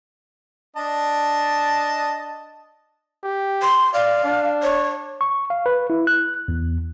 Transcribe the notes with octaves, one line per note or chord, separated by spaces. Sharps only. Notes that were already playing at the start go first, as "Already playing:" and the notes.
D4 D#5 A5
G4
C6
D5 F5
D4
C#5
C#6
F5
B4
E4
F#6
E2